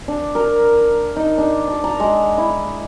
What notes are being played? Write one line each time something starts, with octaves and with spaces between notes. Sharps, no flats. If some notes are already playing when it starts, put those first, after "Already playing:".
D4
A#4
D#4
D4
A5
A#5
G#3
E4